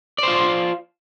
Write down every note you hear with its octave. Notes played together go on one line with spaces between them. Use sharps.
F4 C5 D5